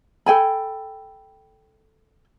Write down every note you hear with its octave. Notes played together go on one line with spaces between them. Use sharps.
A4 G5 G#5 B5